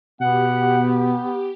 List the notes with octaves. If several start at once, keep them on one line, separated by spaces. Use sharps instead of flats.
B2 B3 G4 F#5